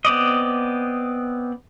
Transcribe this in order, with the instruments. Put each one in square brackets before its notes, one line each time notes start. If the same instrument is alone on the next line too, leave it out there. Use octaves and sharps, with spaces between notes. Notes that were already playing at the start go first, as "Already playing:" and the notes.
[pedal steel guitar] B3 C4 D5 D#5